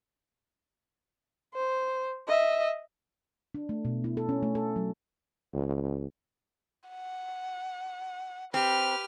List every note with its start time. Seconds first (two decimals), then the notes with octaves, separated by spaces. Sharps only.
1.54 C5
2.28 D#5 E5
3.55 D4
3.69 A3
3.85 B2
4.04 E4
4.17 A4
4.29 C#4
4.43 A3
4.55 A4
4.76 F#3
5.54 C#2
6.90 F#5
8.54 C4 G4 B4 F6